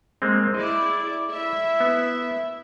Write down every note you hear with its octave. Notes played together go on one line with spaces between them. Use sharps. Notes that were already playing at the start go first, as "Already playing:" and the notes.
G#3 A#3 C4
E4 G#4 D5 D#5
E4 E5
B3